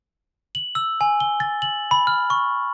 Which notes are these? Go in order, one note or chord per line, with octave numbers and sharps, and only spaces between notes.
F#7
E6
G#5
G7
A6
F#7
B5
F6
C#6